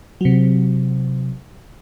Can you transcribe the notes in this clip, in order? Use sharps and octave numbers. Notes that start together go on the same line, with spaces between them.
C3 F#3